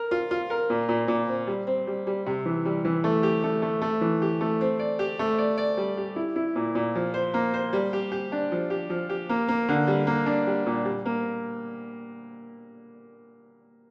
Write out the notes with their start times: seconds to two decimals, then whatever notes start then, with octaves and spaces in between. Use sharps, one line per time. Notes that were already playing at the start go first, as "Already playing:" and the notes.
Already playing: A#4
0.11 F4
0.31 F4
0.50 A#4
0.70 A#2
0.89 A#2
1.08 A#2
1.28 C4
1.47 G3
1.67 C4
1.87 G3
2.07 G3
2.26 C3
2.46 E3
2.65 G3
2.85 E3
3.04 A3
3.23 G4
3.44 A3
3.62 A3
3.82 A3
4.01 E3
4.22 G4
4.41 A3
4.61 C4
4.79 D5
4.99 G4
5.19 A3
5.38 D5
5.58 D5
5.77 G3
5.97 G4
6.16 E4
6.36 E4
6.55 A#2
6.75 A#2
6.95 F3
7.14 C5
7.34 A#3
7.54 C5
7.73 G3
7.93 G4
8.12 G4
8.32 D4
8.52 F3
8.70 G4
8.90 F3
9.09 G4
9.29 A#3
9.48 A#3
9.69 D3
9.87 G3
10.07 A#3
10.26 D4
10.47 G3
10.66 A#2
10.85 G3
11.06 A#3